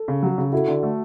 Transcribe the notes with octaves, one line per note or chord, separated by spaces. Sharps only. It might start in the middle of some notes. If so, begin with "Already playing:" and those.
Already playing: A4
C#3
F#3
C#3
E4 F#4 A4
D3
A3